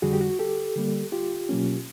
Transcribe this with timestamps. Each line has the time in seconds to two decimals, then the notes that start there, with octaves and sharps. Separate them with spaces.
0.02 F2 D3 G3 F#4 G#4
0.13 G4
0.21 F#4
0.39 G4 A4
0.76 D3 G3 A#3
1.12 F4 G4
1.49 B2 F#3 A#3 C#4